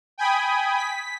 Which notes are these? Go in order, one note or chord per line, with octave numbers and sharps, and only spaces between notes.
G5 G#5 B5 D#6
B6